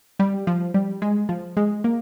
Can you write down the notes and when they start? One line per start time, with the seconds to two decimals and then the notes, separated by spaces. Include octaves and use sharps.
0.19 G3
0.47 F3
0.74 G3
1.02 G#3
1.29 F3
1.57 G#3
1.84 A#3